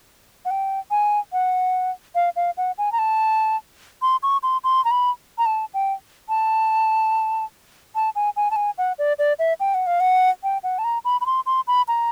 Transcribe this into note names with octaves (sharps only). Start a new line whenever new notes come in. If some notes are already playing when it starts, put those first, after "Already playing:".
F#5
G5
G#5
F#5
F5
F5
F#5
G#5
A#5
A5
C6
C#6
C6
C6
A#5
B5
A#5
A5
G5
A5
A5
G#5
G#5
A5
G#5
F#5
D5
D5
E5
G5
F#5
F5
F#5
G5
F#5
A5
A#5
B5
B5
C6
C6
B5
A#5